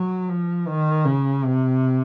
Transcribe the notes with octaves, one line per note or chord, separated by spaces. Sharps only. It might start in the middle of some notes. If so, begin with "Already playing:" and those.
Already playing: F#3
F3
D#3
C#3
C3